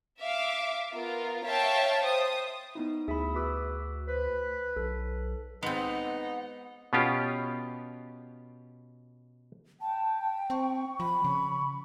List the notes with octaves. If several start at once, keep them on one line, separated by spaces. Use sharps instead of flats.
E5 F5 D6
B3 F4 A#4
C#5 E5 F5 G5 A5
C5 D#6
B3 D#4 E4
D2 G#4 E5 B5
F#4 B4 D6 E6
B4 C5
B1 A4
G#3 B3 C4 D#4 F#5
B2 B3 C#4 F4 G4
G5 A5
C4 C#6
F3 B5
C#3 C#6